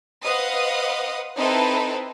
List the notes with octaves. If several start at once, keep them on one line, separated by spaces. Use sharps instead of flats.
B4 C5 D#5 F5 F#5 D#6
C4 D#4 E4 A4 B4 C5